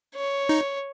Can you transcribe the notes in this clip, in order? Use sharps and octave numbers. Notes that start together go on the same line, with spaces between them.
C#5
D#4